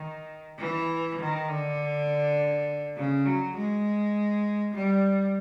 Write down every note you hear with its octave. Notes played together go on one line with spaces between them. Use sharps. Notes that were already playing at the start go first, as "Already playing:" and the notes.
Already playing: D#3
E3
D#3
D3
C#3
F#3
G#3
G3